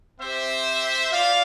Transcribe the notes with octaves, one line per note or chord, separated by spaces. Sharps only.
C4 G4 C5 E5
F4 D5 F5